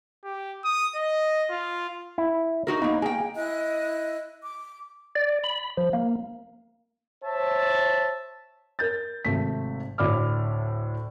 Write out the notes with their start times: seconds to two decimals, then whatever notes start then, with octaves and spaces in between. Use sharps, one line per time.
0.24 G4
0.65 D#6
0.96 D#5
1.51 F4
2.18 E4
2.67 D#4 F#4 A#4
2.82 A#3 B3 D#4
3.02 A#3 G#4 G5
3.36 E4 D#5 F#6
4.41 D6
5.15 D5
5.44 B5
5.77 F3
5.93 A#3
7.23 C5 C#5 E5 A5
8.79 A#4 G6 A6
9.25 G#1 C3 A3 B6
9.98 D2 A2 D5 B5 D6 F6